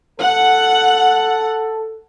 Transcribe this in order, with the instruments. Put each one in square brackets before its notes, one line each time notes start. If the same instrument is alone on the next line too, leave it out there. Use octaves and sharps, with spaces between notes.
[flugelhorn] A4 [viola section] F#5